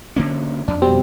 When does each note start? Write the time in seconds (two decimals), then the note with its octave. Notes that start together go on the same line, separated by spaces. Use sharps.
0.16 D3 A#3 C#4
0.68 F2 D4
0.82 B2 G3 C4